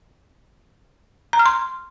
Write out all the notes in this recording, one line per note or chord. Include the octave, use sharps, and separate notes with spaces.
A#5
F6
C6